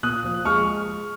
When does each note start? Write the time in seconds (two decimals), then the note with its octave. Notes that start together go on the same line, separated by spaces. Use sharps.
0.03 A#2 D#6 F#6
0.24 F3
0.45 G#3 C#6 F6